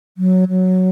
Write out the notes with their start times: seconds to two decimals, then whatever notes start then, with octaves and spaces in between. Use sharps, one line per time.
0.17 F#3
0.49 F#3